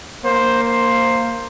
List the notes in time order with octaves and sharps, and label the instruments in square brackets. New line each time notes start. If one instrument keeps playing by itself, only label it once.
[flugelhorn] A#3 [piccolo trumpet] C5
[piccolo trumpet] C5